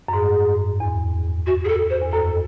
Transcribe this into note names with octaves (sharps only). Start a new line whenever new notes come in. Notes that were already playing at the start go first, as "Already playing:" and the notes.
F#2
G#2 G#4
E2
F#4
G#4
A4
C5
E2
F#2 A4